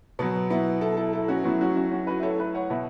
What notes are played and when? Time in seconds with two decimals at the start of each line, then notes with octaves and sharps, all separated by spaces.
0.19 B2 F#3 B3
0.50 B3 E4
0.81 E4 A4
0.97 E4 A4
1.13 E4 A4
1.28 C#4 F#4
1.44 A2 F#3 B3 E4
1.61 C#4 F#4
1.76 C#4 F#4
1.91 C#4 F#4
2.07 F#4 B4
2.19 E5
2.23 A4 C#5
2.39 B4 E5
2.54 C#5 F#5
2.70 B2 B4 E5